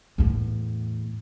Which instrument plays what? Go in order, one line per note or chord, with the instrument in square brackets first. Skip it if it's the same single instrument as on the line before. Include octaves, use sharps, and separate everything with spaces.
[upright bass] E2 A2